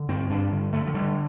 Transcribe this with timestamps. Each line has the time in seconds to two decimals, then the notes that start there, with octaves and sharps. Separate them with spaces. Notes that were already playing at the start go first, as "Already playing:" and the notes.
Already playing: D3
0.08 G2 C4
0.30 G2 D4
0.52 D3
0.73 D3 A3
0.86 F3
0.94 D3 G3